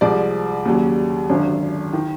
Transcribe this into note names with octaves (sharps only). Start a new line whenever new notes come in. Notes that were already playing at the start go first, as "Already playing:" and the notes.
C2 C3 F3 G#3 D5
D#2 C#3 F#3
G#1 F#2 D3
D#3